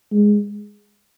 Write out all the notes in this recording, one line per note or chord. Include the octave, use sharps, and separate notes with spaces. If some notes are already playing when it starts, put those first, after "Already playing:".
G#3